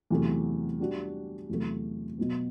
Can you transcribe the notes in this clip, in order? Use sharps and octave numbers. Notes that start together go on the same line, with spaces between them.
E2 C3 F#3 A3
G3 D4 F#4
E2 C3 F#3 A3
B2 F#3 B3